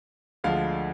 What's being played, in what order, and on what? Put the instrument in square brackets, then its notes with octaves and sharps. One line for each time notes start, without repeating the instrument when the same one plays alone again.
[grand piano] D2 D3 F3 G#3 F5